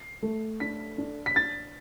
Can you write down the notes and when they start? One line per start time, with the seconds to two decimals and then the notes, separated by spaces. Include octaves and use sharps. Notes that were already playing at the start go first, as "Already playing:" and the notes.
Already playing: C7
0.22 A3
0.60 D4 B6
0.98 D4
1.26 B6
1.36 D4 A6